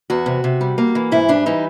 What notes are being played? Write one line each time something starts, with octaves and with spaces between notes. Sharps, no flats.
E2 F#4
C3
C3
G3
A#3
E3
G#2 E4
G3 D4
E3 D#4